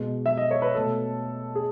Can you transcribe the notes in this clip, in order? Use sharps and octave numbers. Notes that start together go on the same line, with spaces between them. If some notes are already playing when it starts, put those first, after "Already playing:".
Already playing: B2 G#3
E5
D#5
C#5
B4
B2 A3 A4
G#4